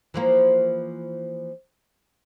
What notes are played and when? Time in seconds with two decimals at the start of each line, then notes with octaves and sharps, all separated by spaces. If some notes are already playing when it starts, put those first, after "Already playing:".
0.14 E3 F3 A#3